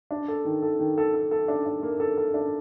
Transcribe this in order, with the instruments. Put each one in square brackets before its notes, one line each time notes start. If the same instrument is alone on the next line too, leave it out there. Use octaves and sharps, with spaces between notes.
[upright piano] D4
A4
D#3
A4
D#3
A4
A4
A4
D4
D4
A#3
A4
A4
D4